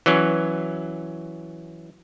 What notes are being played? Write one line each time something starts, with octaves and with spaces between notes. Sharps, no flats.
E3 F#3 C#4